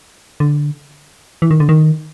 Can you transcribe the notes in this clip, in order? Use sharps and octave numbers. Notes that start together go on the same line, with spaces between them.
D3
E3
D#3
D3
D#3